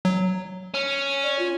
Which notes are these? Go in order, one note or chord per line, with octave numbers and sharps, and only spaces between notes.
F#3
C#4
D5
F4